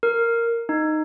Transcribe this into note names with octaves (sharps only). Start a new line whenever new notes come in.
A#4
D#4